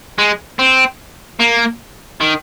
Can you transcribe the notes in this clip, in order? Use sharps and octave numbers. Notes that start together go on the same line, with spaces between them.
G#3
C4
A#3
D#3